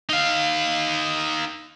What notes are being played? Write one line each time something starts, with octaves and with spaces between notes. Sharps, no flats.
D#4 F5